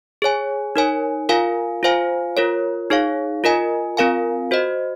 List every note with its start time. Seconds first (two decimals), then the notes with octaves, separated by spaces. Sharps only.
0.22 G#4 C#5 G#5
0.76 D#4 A#4 C#5 G#5
1.29 F4 A#4 F5 G#5
1.83 F4 C5 F5 G#5
2.37 F4 A#4 C#5
2.90 D#4 G#4 C#5 F5
3.44 F4 A#4 D#5 G#5
3.97 C4 F4 A#4 F5 G#5
4.51 F#4 C5 D#5